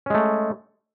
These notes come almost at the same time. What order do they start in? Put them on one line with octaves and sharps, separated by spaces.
C#4 G#3 A3